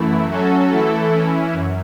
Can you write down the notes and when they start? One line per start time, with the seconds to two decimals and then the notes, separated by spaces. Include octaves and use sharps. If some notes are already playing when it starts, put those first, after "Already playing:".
Already playing: F#2 E3 A3 E4
0.30 F#3 C#4 F#4 A4
0.71 E3 A3 E4 A4
1.12 E3 C#4 E4
1.53 F#2